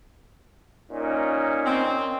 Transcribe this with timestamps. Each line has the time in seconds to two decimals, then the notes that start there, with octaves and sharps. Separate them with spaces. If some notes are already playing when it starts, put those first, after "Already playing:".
0.91 A#2 C#4 D#4
1.65 C4